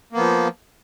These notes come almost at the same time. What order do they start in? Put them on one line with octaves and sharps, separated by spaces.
A#3 B3 F3